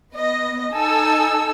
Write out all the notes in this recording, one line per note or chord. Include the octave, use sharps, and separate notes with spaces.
B3 D#5
D#4 A4 G#5 E6